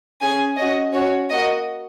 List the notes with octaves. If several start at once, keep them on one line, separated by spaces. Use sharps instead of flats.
C#4 G#4 G#5
C#4 F#4 D#5
C#4 F#4 C#5
A#3 F#4 D#5